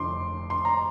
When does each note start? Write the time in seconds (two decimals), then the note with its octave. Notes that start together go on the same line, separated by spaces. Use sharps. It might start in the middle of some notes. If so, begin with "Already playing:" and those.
Already playing: F1 F2 D3 C6 D6
0.50 C6
0.65 A#5